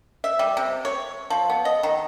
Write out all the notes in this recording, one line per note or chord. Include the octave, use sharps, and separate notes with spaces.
E5
G3
C3
C#5
F3
B3
D#5
D#3